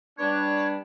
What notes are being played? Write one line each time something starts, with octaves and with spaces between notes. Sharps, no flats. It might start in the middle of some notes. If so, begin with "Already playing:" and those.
G3 B3 D4 C#5